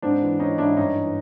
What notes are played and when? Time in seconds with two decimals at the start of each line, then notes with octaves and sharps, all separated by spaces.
0.02 G#2 C4 D4
0.22 E3
0.40 E3 C#4 D#4
0.58 G#2 D4 E4
0.77 G2 C#4 D#4
0.95 E3